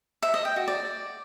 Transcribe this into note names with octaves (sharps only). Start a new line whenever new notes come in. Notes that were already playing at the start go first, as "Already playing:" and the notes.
E5
D#5
G5
F#4
D5